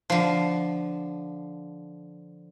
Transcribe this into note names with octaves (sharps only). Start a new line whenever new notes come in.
D3 F3